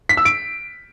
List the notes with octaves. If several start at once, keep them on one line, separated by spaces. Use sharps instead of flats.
B6
E6
D7